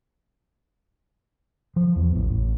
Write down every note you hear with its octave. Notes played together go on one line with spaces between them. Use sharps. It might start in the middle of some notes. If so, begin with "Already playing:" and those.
F3
E2
A1
A1